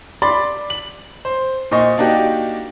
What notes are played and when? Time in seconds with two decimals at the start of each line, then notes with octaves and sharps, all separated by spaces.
0.22 D5 B5 C6 D6 A6
0.70 F#7
1.25 C5
1.71 A#2 C5 D#5 C#6
1.98 A#3 D4 D#4 F#4 G4